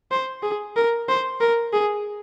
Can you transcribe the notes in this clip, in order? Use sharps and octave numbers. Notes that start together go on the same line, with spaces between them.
C5
G#4
A#4
C5
A#4
G#4